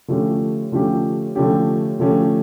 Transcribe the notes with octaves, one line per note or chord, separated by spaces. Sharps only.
D3 F3 A3 C#4 G4
D3 F3 A3 C#4 G4
D3 F3 A3 C#4 G4
D3 F3 A3 C#4 G4